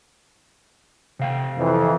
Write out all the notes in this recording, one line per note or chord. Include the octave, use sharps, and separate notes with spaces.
C3 F5 G5
F2 E3